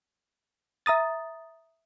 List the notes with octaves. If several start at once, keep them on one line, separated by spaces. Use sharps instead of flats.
E5 A#5 D#6 A6